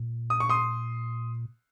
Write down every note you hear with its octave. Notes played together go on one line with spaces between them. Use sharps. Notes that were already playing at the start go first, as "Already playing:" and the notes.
Already playing: A#2
D#6
C#6
C6 D#6